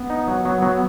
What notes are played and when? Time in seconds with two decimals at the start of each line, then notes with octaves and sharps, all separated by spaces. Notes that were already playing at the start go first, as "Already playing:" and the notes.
Already playing: B3
0.10 D#4
0.27 F#3
0.45 F#3
0.62 F#3